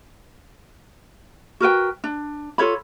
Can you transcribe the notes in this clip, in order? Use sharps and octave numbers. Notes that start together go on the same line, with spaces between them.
F#4 A#4 B4 G5
D4
F4 A4 C#5 B5